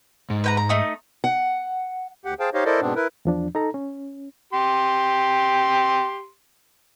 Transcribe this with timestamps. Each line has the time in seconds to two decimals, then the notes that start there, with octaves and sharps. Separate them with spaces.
0.30 G#2
0.44 B4 G5 A#5
0.57 A#5
0.69 A3 D#4 D#6
1.24 F#5
2.25 D2 G4 F#5
2.40 G#4 C5 F5 G5 A5
2.54 D#4 G4 C5 C#5 D#5 F5
2.65 E4 A4 A#4 C5 D5 D#5
2.81 G#2 B2 B3 C4 D4
2.96 E4 A#4 B4
3.25 E2 F3 D4
3.55 D#4 A4 A#5
3.74 C#4
4.53 G4 C6